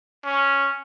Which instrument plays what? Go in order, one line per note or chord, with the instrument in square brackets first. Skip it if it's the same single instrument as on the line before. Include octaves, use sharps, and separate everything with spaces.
[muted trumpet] C#4